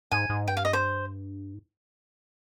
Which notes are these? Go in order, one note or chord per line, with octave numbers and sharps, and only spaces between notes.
G#2 G#5
G#2
G2 G5
F5
D#5
C5
G#2